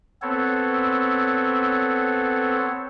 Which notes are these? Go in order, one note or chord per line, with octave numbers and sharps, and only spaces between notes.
B3 C4 A4 C#5